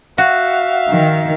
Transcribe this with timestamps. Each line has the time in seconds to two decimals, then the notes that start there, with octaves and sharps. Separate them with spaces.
0.18 F#4 E5 F5
0.89 D#3